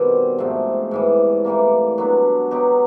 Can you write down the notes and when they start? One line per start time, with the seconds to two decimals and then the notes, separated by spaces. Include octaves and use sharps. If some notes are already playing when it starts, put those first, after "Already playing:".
Already playing: B2 D#3 G3 C4
0.38 G#2 F3 A3 C4
0.91 G#2 E3 G3
1.44 A2 E3 G3 A#3
1.98 F#3 B3 D4
2.51 F#3 B3 D#4 G4